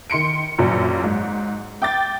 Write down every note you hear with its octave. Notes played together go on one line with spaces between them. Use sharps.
D#3 C6 C#7 D7
A#1 F#2
G#2
G5 D6 A6